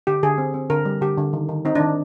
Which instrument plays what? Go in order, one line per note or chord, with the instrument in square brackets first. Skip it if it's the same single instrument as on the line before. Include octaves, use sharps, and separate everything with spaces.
[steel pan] D3 G4
D3 G#4
C4
C4
D3 A#4
G3
D3 G4
D3
D#3
D#3
C4 D#4
D#3 D4